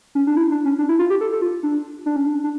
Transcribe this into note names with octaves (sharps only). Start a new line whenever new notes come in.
C#4
D4
E4
D4
C#4
D4
E4
F4
G4
A4
A4
F4
D4
D4
C#4
D4
D4